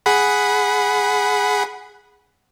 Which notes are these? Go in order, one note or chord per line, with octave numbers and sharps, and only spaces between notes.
G#4 F#5 B5